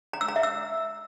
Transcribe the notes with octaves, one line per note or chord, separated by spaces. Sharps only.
A#5
E6
A#5
E5
E6